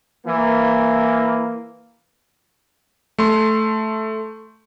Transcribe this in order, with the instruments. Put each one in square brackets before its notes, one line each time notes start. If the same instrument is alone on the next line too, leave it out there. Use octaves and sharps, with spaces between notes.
[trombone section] E3 A#3
[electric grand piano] A3 C6